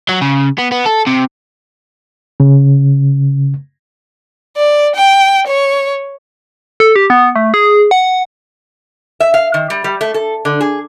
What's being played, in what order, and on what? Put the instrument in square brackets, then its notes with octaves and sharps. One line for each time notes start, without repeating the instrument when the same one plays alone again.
[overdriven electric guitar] F#3
C#3
B3
B3
A4
C3
[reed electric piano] C#3
[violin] D5
G5
C#5
[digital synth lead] A4
G4
B3
A3
G#4
F#5
[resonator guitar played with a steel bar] E5
F5
D#3
G3
G3
A3
A4
D3
G#4